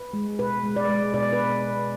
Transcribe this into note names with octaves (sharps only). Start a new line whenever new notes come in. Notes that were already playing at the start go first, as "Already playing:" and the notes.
Already playing: B4
G#3
B2 B4
G#3
D5
G#3
B2 D5
B4